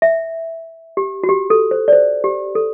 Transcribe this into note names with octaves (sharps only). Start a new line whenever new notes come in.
E5
G4
F#4
G4
A4
C5
D5
C5
G4
A4